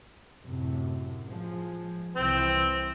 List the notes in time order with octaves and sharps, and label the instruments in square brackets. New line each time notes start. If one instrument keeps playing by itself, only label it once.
[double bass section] F#2 A2 C3
F3 G#3
[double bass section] C2 C3 E3 [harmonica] C4